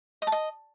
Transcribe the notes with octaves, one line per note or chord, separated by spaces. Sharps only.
D#5
A5
D#5